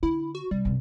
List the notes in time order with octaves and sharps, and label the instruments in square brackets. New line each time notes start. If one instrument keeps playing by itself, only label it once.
[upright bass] D3 [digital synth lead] E4
[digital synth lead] F#4
[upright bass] C3 [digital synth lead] G3
[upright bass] F#2 C3